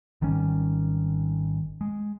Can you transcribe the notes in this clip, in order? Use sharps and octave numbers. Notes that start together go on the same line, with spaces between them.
G#1 D#3 G3 C#4
G#3